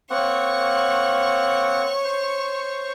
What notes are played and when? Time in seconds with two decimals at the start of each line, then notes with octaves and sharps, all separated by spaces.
0.10 A#3 C4 C#5 F#5 C#6
2.05 C5